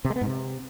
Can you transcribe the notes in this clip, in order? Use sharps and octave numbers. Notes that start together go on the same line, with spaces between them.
C3
G#3
B3
G#2
C3